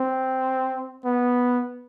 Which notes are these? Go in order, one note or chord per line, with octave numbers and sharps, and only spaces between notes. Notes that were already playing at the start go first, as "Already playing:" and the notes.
Already playing: C4
B3